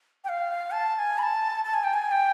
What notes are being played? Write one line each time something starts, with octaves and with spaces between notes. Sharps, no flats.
G5
F5
A5
A5
G#5
B5
A5
A5
G#5
G5
G#5
G5